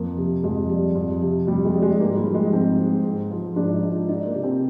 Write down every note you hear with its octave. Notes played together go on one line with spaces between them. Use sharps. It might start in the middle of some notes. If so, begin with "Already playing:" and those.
Already playing: F2 A#3
C3
F2 G#3
G3
F2
C3
F2 G3
G#3
G3
G#3
G#2 A#3
G3
F3
G#3
G#2 C4
G#3
G#2
F3
G#2 D4
D#4
G#3
F4
D4 D#4
A#3
C3
C4